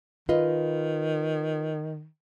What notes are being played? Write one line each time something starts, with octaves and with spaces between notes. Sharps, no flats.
D#3 F4 B4 D#5